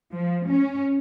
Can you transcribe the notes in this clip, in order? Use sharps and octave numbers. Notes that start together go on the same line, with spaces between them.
F3
C#4